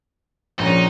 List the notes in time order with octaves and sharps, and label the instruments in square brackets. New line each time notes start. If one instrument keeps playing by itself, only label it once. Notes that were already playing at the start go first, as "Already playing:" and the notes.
[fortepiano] A#1 C#4 [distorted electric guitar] D#4